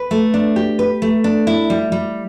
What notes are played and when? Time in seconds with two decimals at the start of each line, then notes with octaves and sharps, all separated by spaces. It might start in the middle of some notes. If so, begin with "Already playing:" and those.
Already playing: B4
0.11 A3
0.34 D4
0.56 G4
0.79 B4
1.02 A3
1.24 D4
1.47 E4
1.70 G3
1.92 G3